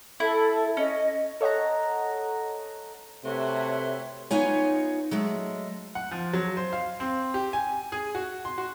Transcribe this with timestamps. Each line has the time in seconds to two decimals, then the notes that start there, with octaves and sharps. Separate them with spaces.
0.20 E4 A4
0.77 C#4 D#5
1.41 A4 C#5 D#5 F#5 A#5
3.24 C3 A3 F#4 B4 C#5 E5 C6
4.31 B3 D#4 F4 C#5 G#5
5.11 F#3 G#3 A3
5.95 F#5
6.11 F3
6.33 F#3
6.57 C5
6.73 F5
7.00 C4
7.34 G4
7.53 G#5
7.92 G#4
8.15 F#4
8.45 C6
8.58 F#4